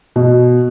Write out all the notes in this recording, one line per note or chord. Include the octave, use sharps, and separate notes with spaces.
B2